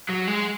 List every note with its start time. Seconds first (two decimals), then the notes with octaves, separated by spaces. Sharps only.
0.09 F#3
0.27 G#3